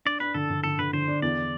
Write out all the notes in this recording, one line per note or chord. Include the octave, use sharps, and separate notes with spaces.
D4 D5
D4 B4
D3 A4
D3
D3 A4
D3 B4
D3 C5
D4
E2 D5